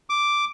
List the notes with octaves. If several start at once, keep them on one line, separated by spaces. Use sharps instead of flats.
D6